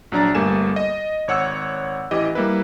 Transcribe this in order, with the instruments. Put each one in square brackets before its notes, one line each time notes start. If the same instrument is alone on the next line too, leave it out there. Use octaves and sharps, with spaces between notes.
[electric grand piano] A#1 F#3 D4 D5 A#5 A6
G1 G3 A3 A#3 G#5 E7
D#5
G#1 C#5 F#5 E6 C#7
A1 E3 G4 D#5
G3 A#3 E4 B4